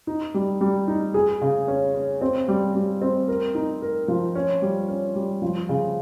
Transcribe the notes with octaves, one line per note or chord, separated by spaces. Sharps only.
D#4
G3
G3
D#4
G#4
C#3
C#4
C#4
C4
G3
G3
C4
A#4
D#4
A#4
F3
C#4
G3
C#4
G3
F3
C#3